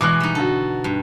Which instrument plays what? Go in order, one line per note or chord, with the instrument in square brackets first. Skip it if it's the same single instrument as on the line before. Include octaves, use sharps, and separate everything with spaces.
[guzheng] B2 E3 G#3 [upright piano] D6 F#6
[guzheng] G3 D#4
[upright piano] D3 F#4 [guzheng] A4
[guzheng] G2